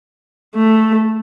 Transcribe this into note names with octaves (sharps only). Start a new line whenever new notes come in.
A3